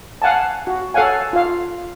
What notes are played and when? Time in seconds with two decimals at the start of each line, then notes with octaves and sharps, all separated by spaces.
0.22 F5 F#5 G#5 A5
0.67 F#4
0.94 A4 C#5 F5 F#5 G#5
1.33 F4 F5